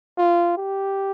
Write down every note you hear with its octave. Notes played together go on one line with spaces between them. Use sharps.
F4
G4